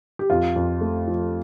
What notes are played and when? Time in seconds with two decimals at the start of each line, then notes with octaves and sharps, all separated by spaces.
0.19 G4
0.30 F2 F4
0.56 F2
0.81 A3
1.08 F3